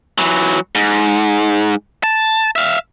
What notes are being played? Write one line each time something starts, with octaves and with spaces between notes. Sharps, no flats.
E3 F#3
G#2
A5
E5 F5